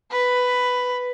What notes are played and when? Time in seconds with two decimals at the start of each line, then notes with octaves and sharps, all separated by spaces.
0.11 B4